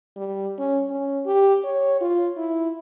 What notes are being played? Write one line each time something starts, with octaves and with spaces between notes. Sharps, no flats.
G3
C#4
C#4
G4
C#5
F4
E4